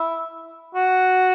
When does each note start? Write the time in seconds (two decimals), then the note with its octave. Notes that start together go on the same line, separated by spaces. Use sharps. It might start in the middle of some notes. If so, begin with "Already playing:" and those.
Already playing: E4
0.75 F#4